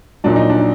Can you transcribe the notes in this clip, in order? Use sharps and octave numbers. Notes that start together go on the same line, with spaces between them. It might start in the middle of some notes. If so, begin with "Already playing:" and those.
A#1 A#2 F#3 D4
D#4
D4